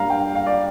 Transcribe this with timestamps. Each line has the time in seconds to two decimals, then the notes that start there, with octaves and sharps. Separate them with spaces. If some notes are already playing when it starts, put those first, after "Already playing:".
Already playing: G2 G3 A#3 F5 A#5
0.10 G5
0.35 F5
0.47 D5